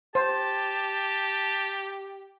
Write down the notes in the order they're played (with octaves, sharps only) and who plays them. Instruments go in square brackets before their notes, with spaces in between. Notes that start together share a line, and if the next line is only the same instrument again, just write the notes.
[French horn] G4 [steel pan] C5 [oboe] A5